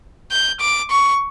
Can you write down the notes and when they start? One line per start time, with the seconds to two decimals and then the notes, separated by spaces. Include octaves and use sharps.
0.31 G6
0.61 D6
0.91 C#6